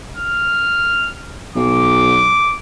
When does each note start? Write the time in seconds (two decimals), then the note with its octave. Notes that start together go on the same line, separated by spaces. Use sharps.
0.16 F6
1.56 B1 D6